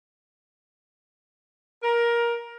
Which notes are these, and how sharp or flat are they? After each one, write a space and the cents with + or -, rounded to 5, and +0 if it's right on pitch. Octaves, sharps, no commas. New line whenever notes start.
A#4 +15